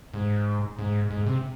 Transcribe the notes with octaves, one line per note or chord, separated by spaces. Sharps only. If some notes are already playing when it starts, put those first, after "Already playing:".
G#2
G#2
G#2
C3